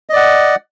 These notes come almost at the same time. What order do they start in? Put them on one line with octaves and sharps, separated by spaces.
D#5 D5 F#5